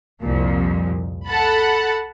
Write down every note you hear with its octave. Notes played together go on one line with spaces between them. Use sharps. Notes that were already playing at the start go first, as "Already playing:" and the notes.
C2 F2 A#2 F3
A4 F#5 A5 B5